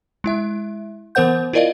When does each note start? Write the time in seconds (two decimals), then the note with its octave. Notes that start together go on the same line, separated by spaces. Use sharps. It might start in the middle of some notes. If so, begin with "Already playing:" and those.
0.24 G#3 E4 E5
1.15 E3 B3 A#4 C5 F#5 G6
1.53 E4 F4 A#4 D5 D#5 F5